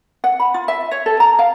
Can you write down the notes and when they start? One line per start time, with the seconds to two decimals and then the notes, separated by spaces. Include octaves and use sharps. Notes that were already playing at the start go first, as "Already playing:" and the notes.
0.24 F#5
0.40 B5
0.54 F4
0.68 E5
0.91 C#5
1.06 A4
1.20 A#5
1.39 F5